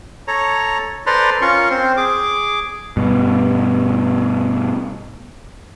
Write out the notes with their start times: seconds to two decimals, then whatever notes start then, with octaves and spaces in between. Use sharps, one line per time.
0.28 A4 C#5 A#5
1.07 A4 B4 C5 D5 A#5 C6
1.41 C#4 F4 A#4 C6 C#6
1.70 C4 C5
1.97 G#4 D6
2.97 G2 B2